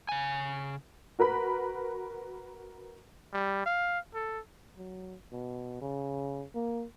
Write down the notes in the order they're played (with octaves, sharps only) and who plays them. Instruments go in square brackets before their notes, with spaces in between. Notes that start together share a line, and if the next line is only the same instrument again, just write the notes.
[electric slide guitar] C#3 G#5
[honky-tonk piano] F#4 A#4 B4 B5
[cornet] G3
F5
A4
[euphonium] F#3
B2
C#3
A#3